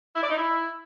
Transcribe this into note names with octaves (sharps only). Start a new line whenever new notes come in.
E4
D5
D#4
E4